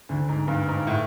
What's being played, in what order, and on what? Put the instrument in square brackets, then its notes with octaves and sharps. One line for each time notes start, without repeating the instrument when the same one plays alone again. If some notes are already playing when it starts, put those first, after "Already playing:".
[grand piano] D2 D3
G#2
G2
G#2
A2